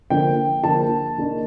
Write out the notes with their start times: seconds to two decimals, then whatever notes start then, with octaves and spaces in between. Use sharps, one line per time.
0.10 D3 F3 A#3 D4 G5
0.63 D3 F3 A#3 D4 A5
1.18 D#3 A#3 D4